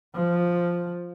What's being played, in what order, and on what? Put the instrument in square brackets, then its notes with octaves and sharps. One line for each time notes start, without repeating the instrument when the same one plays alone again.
[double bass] F3